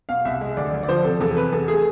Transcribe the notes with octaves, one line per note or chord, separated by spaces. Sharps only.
B2 F5
C2 E5
G#3
D2 D5
D2
D5
F3 C5
C3 A4
E2 A4
C3 B4
E2 A4
A3 G#4